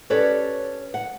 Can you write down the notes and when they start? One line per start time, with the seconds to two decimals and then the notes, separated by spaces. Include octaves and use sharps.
0.10 C#4 G4 A4 B4 C#5 D5
0.94 F#5